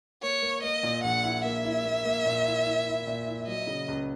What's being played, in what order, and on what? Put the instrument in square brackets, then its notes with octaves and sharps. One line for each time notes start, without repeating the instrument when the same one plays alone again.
[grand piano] A#3 [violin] C#5
[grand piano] A#3
[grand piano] A#3 [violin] D#5
[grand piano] A#2
[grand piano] A#1 [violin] F#5
[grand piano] E4
[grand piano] A#3 [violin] E5
[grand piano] E4
A#3
A#3
A#2
E4
E4
E4
A#2
E4
[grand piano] F#3 [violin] D#5
[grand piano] C#3
C#2